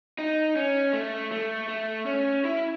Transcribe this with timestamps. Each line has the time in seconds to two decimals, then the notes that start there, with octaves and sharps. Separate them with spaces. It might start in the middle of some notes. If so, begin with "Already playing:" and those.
0.19 D#4
0.56 C#4
0.93 A3
1.32 A3
1.69 A3
2.06 C#4
2.44 E4